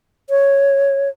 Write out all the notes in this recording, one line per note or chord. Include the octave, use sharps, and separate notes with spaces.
C#5